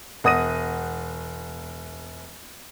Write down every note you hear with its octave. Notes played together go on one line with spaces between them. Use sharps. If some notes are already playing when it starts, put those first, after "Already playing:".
E1 F#5 D#6 A#6 D#7